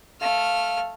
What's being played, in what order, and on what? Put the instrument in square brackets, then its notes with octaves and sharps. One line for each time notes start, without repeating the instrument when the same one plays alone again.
[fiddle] A3 F6 [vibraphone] F5